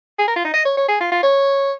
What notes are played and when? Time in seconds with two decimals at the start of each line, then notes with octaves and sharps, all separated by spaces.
0.19 G#4
0.28 A#4
0.36 F4
0.45 D#4
0.54 D#5
0.65 C#5
0.77 C#5
0.88 G#4
1.00 F4
1.12 F4
1.23 C#5